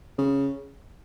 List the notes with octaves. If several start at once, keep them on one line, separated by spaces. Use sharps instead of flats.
C#3